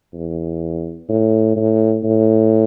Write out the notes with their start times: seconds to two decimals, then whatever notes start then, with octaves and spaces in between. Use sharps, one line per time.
0.14 E2
1.09 A2
1.56 A2
2.03 A2